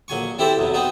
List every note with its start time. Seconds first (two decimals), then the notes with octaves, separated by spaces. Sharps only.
0.08 A#1 F#3 G#5 C#6
0.39 C4 E4 G4 A4 C5
0.58 B1 E2 C3
0.74 B3 C4 D#4 F#4